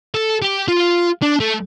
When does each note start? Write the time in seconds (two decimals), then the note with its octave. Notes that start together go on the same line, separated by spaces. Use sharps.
0.15 A4
0.42 G4
0.68 F4
1.22 D4
1.40 A3